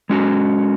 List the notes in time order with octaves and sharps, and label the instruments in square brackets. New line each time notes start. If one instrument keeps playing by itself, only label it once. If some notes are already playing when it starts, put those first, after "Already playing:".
[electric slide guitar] G#3 C#4 F#4